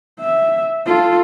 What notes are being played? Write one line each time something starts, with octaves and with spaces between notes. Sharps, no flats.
E5
F4 A4